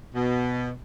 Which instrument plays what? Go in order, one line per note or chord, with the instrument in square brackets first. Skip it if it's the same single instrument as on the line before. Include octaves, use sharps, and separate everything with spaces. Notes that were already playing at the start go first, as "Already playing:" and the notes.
[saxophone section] B2